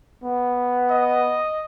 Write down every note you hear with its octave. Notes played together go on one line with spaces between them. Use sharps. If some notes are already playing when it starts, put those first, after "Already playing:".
B3
D#5